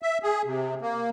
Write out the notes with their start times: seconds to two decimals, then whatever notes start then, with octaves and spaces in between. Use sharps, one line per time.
0.02 E5
0.23 G#4
0.45 C3
0.82 A#3